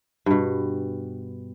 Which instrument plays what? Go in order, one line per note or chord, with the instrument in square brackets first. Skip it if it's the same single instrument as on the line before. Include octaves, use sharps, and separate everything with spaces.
[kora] G2 B2